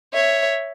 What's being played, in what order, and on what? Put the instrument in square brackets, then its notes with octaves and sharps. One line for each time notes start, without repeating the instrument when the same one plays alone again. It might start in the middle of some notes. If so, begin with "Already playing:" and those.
[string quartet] C#5 E5